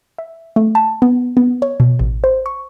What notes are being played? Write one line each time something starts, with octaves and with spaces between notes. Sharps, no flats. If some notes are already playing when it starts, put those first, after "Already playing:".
E5
A3
A5
B3
B3
C#5
B2
A1
C5
C#6